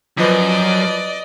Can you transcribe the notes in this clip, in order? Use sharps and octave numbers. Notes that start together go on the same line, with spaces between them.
F#2 F3 B4 D5 D#5